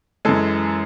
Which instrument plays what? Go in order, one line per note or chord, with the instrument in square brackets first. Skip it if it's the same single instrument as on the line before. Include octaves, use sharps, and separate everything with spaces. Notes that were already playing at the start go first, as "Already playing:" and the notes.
[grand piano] F#2 E3 G#3 A4